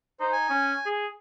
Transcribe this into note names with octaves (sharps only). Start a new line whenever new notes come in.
D#4 C5
G#5
C#4
G#4